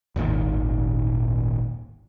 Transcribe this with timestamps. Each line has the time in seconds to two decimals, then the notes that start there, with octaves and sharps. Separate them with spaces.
0.16 D#1 G#1 A#2 D#3